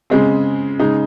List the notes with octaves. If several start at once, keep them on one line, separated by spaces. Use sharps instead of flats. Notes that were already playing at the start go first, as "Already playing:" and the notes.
C#3 G#3 C4
C#3 G#3 D#4